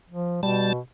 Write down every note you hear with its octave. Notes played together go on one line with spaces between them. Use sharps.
F3
B2 G3 A5